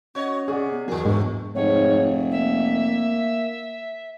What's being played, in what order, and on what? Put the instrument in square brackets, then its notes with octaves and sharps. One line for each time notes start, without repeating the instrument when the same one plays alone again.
[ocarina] C#4 [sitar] F#4 C#5 D#5
[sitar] C3 [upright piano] G#4 D5 F#5
[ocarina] B3
[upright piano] E2 F#3 [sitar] G3 G#4 [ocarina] A#4
[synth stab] G#2 [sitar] B2 A3 [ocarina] D4
[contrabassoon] F1 [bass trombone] G#2 [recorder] C#5
[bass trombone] A#3 [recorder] E5